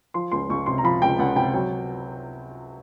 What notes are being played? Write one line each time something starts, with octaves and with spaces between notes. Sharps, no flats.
F3 C6
C#2 C6
C#2 C#6
C3 C6
A#5
F3 B5
C#2 G5
C#2 F#5
C3 G5
F#3 G5